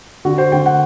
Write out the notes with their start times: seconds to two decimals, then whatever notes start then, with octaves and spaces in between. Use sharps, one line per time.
0.25 D3 F#4
0.38 C5
0.52 D3 G5
0.66 F#5